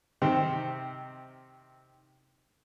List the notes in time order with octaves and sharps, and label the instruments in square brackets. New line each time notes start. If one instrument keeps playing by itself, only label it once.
[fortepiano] C3 D#3 C4